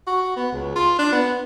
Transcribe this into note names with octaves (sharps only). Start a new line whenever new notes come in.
F#4
B3
C#2
F4
D4
B3